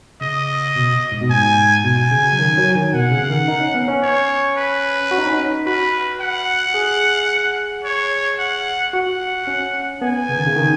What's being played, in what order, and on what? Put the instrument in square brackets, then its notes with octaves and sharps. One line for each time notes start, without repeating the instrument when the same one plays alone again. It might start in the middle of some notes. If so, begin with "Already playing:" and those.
[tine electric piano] C#3 [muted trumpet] D#5
[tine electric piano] B2
G#2
B2
[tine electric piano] G#2 [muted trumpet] G#5
[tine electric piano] B2 [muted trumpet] G#5
[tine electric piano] C#3
F#3
D#3
F#3
D#3
[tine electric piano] B2 [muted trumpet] F#5
[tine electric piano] C#3
D#3
D#4
C#4
B3
C#4
[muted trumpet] C#5
B4
[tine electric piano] F#4
D#4
C#4
D#4
[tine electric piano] F#4 [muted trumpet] B4
[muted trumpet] F#5
[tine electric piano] G#4
[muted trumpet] C#5
F#5
[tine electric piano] F#4 [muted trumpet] F#5
[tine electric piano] C#4
[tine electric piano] B3 [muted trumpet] G#5
[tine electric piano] C#3
D#3
C#3
D#3